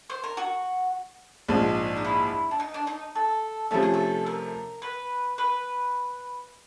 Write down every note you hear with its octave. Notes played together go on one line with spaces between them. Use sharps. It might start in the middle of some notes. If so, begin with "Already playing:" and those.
C5
A#4
F#4
A#1 G#2 F3 G#3
D#4
E4
D4
D#4
D4
D#4
A4
C3 F3 A3 C#4 A4
G#4
A4
A#4
B4
B4